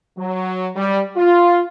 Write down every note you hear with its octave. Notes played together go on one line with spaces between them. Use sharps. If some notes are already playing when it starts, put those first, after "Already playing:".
F#3
G3
F4